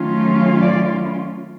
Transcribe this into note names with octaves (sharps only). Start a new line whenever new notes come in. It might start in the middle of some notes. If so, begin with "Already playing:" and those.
Already playing: D#3 F#3 A3 C#4 F4
D5